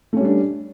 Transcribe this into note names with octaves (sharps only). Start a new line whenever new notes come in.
G3 A3 C#4 D4